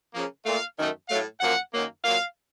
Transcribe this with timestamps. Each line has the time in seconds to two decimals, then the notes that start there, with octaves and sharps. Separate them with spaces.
0.13 C#3 F3 A#3
0.45 A#2 A3 F5
0.77 F#2 D#3 A3
1.09 A2 F#3 A3 F5
1.40 F#2 F3 A#3 F#5
1.73 F#2 D#3 F#3 A#3
2.04 A#2 F#3 A#3 F5